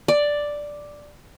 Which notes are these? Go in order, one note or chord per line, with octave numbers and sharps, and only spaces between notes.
D5